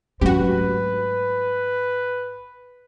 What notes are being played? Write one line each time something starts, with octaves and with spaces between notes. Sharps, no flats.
G#1 F#3 A3 C#4 F#4 G4 B4